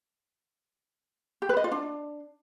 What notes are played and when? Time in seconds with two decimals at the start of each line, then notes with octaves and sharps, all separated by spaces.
1.42 G4
1.49 B4
1.57 D#5
1.64 F4
1.71 D4